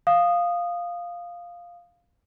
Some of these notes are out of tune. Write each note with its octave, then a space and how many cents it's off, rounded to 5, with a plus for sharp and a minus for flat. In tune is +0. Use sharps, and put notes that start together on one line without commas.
F5 +0 D#6 -15